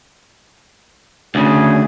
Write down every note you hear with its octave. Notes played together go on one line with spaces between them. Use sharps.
D2 C#3 G#4